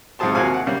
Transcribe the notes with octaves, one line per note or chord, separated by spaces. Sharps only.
G#2 C3 F3 G#4 A5 C6
D#2 C3 F#4 F5 G#5
F#5
C#3 G3 A#3